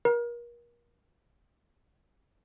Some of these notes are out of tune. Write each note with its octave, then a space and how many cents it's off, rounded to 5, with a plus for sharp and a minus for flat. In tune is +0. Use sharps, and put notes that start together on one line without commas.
A#4 +35